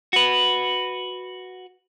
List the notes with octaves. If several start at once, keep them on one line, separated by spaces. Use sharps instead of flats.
F#4 B4